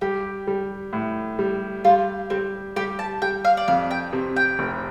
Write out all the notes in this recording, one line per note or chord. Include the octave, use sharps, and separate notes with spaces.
G3 G4
G3
A2
G3
G3 F4
G3 C4
G3 G4
A5
G3 G5
F5
D5
F2 F5
G5
C3
G5
F1